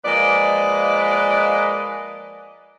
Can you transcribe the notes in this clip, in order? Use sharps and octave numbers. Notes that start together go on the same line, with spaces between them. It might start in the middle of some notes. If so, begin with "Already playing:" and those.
F3 G#3 A#3 B4 D5 D#5